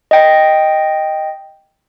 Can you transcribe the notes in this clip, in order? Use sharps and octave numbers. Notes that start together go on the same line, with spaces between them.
D#5 G5